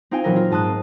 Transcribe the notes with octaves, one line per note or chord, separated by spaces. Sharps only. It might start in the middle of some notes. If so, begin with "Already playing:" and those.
C4 D#4 F4 F5 G5 G#5
A#2 E3 F#3 E4 A#4
F4
G#2 D#5 A5 C6 D#6 F#6
C4